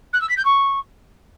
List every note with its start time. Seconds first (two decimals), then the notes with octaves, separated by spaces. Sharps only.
0.13 F#6
0.21 E6
0.29 B6
0.37 G6
0.45 C#6